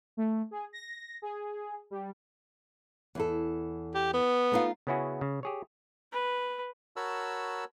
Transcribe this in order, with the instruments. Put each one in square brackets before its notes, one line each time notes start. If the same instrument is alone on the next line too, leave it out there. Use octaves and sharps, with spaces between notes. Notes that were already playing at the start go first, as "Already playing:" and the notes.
[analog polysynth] A3
G#4
A#6
G#4
G3
[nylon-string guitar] E2 E4 A4
[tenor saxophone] G4
B3
[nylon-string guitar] A3 D#4 F4
[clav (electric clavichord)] C#3 B3 C#4 E4 F#4 G#4
C#3
G4 G#4 C#5
[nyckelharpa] B4
[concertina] F#4 A#4 C#5 A5 B5 E6